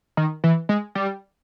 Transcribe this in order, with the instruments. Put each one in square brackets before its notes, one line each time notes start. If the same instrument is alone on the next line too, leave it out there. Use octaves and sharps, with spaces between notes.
[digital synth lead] D#3
E3
G#3
G3